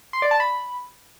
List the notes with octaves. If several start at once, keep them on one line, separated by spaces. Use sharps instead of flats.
C6
D5
A5
B5